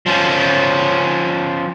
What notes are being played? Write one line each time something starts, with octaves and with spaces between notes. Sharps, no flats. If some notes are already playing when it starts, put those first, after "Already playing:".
F3 C#4